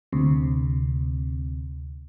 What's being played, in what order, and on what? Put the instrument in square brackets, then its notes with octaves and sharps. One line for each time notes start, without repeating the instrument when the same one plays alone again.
[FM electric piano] D2 C3